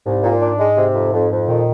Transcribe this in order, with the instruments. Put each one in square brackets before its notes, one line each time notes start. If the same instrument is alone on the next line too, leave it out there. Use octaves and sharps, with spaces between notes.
[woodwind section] C2 [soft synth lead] G#2
[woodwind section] A#2
D4
G#3
C3
F2
F2
F2
[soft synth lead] A#2 [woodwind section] D#3